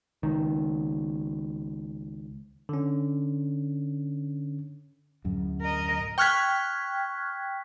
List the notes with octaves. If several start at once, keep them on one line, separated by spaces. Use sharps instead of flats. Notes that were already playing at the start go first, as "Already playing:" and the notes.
C#2 D#3
D3 C#4
D1 F#2
A#4 D#5
G5 C#6 F6 F#6 G#6 B6